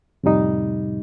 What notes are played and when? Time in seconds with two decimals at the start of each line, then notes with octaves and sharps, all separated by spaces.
0.23 F2 A2 C3 G3 D#4